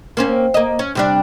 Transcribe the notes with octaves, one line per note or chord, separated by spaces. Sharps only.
A#3 C4 C#4
A#3 D#5
C#4
C3 G3 D4